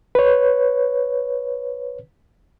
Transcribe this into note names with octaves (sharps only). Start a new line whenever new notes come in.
B4 C#5